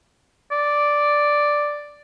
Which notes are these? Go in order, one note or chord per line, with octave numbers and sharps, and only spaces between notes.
D5